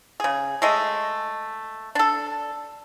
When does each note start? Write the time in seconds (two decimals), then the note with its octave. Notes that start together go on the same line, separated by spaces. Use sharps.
0.20 C#3 G#4
0.62 G#3 A3 D#5
1.95 D4 A4